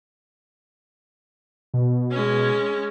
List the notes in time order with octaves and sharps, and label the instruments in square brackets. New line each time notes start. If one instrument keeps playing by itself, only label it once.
[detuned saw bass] B2
[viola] G#3 C#4